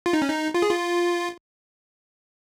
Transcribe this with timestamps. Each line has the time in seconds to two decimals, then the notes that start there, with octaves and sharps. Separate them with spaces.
0.06 F4
0.13 D#4
0.22 C#4
0.30 D#4
0.54 F4
0.62 G#4
0.71 F4